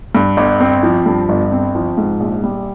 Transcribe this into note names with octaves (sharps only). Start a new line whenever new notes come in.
G2
G1
C4
F3
G2
G1
C4
F3
G#2
A#1
G3